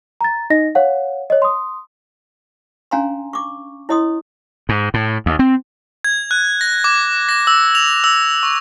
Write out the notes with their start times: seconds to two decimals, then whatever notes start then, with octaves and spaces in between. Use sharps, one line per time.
0.21 A#5 A6
0.50 D#4 D#5 A#6
0.75 C#5 F5 F#5
1.30 C#5 D#5
1.42 C6 D#6
2.91 C#4 D4 F5 G#5 A#5 C6
3.33 C#6 D6
3.89 E4 C#5 D#5 C6 D#6
4.69 G#2
4.94 A2
5.26 D#2
5.39 C4
6.04 G#6
6.31 F#6
6.61 A#6
6.84 D6
7.29 A#6
7.47 E6
7.75 F7
8.04 E6
8.43 C#6